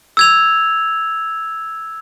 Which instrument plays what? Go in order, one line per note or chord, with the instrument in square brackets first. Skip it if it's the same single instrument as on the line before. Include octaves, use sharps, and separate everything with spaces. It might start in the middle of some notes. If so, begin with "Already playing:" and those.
[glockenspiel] E6 G#6 F7